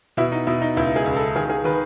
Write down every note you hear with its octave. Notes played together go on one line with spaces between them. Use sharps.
B2 E4
D#4
B2 E4
D#4
C#2 E4
G#4
C#2
A4
D#3 G#4
G#4
D#3 B4